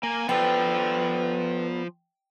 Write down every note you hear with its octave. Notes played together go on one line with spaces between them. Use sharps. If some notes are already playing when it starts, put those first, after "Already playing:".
F#2 A#3 G#5
F3 B3 A4 B4 D5 G5